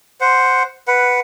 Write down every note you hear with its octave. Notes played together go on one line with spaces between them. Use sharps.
C5 F#5
B4 F#5